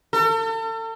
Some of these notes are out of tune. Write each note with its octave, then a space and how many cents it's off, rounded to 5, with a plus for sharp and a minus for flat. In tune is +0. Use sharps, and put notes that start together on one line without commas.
A4 +40